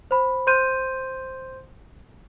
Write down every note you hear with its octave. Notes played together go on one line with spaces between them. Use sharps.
C5 B5
C5 C6 G6 D#7